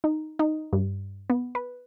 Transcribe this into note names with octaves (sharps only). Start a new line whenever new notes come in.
D#4
D#4
G2
B3
B4